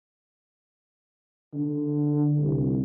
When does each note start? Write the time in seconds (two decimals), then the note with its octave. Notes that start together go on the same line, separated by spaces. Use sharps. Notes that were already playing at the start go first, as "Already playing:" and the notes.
1.54 D3
2.40 C2